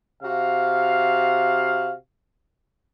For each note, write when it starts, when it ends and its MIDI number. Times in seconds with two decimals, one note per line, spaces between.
0.23 1.95 48
0.23 1.95 66
0.23 1.95 77